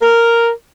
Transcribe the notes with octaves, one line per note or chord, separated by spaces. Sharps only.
A#4